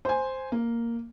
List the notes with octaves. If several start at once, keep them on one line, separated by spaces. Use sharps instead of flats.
C5 G#5
A#3